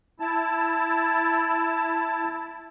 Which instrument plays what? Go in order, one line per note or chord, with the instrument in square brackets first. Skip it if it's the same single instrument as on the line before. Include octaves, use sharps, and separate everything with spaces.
[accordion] E4 A5